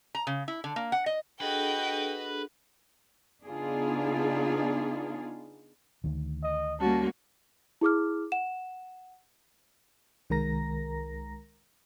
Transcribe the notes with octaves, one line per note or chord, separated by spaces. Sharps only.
A#5
C#3
E4
D3
A#3
F#5
D#5
D4 F#4 G#4 A4 B4 D#5 G5
C#3 B3 D4 D#4 F4 G#4
D2 D#3
D#5
G3 A#3 C#4 F#4 A5
E4 G#4 D6 F6
F#5 E7
C2 D#3 G#3 A#4 A#5 A#6